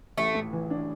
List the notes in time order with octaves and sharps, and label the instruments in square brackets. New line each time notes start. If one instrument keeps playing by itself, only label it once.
[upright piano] A1 [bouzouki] A3
[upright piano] A2
E3
D4